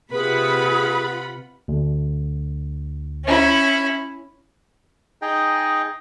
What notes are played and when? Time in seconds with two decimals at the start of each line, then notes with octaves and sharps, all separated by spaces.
0.13 C3 F4 G#4 B4 F#5 B5
1.68 D2
3.25 C#4 E4
5.22 D#4 G#4 D#5 G5